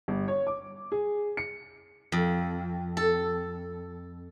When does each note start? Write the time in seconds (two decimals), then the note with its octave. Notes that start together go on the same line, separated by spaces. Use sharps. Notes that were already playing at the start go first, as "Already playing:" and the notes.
0.08 G1
0.28 C#5
0.47 D6
0.92 G#4
1.37 C#7
2.12 F2
2.97 A4